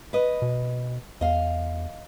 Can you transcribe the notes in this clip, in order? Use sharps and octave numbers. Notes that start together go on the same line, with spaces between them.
B4 D#5
B2
E2 D#5 F5